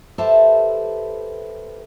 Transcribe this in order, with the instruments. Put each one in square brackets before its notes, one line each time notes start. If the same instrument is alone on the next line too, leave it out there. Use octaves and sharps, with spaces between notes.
[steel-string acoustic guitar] G4 A4 B4 C5 E5 A5